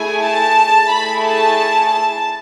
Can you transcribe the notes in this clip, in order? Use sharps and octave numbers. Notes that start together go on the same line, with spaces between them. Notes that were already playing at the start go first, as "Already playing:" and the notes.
Already playing: A3 E4 G#4 G#5
A5
A3 E4 G#4 B5
A5
A5